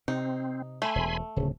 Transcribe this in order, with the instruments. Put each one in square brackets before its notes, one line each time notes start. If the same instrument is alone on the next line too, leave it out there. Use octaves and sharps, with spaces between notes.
[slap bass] C3 [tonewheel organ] C4 [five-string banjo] D#4
[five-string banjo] A3 [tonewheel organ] G#5 B5 C6
[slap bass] E1
[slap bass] D1 [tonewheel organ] C#3